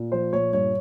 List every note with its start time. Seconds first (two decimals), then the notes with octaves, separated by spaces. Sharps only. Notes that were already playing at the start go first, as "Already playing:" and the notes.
Already playing: A#2
0.12 F3 C5
0.33 A#2 C#5
0.53 G2 C#5